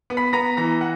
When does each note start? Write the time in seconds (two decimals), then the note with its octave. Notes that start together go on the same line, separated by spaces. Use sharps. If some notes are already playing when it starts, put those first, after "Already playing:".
0.10 B3
0.17 B5 B6
0.33 B3 A#5 A#6
0.57 E3 A#5 A#6
0.81 F#5